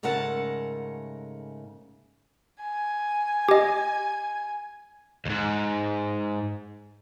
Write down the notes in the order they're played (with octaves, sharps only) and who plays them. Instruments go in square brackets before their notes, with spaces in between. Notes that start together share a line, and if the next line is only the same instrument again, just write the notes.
[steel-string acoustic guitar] G#2 C#3 A3 A#4 F#5 A5
[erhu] G#5
[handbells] G4 D#5
[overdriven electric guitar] D#2 G#2